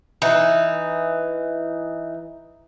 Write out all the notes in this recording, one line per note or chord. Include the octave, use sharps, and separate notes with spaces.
E3 D#4